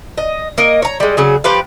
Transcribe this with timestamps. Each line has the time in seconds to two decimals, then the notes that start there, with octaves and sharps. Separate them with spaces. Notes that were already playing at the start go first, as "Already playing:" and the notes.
0.18 D#5
0.58 A#3 A#4 D#5
0.82 C#5 A#5
1.00 G3 G#3
1.17 C#3 F#3 G#4
1.44 F3 G4 B4 F5